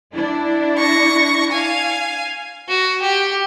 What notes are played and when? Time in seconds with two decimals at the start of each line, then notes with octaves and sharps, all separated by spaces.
0.15 D4 E4
0.78 C#6 A#6
1.51 F5 G#5
2.69 F#4
3.02 G4